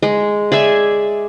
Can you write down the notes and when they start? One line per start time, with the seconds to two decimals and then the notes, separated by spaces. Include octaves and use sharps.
0.02 G#3
0.52 G#4 D5 E5 G#5